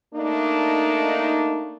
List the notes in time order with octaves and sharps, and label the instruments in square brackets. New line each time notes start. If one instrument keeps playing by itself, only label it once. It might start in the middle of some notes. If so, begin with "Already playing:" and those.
[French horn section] A3 A#3 D4 D#4